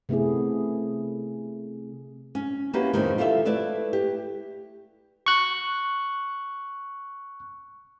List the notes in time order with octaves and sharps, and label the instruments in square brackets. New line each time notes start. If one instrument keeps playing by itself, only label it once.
[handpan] C3 A3 B3 E4 G#4
[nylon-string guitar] C#4
A#3 C#4 E4 F#4 G4 B4
F2 A2 C3 D#3
E4 F4 G4 A4 D#5 E5
A3 E4 B4 D5 E5
G4
[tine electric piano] C#6 F#6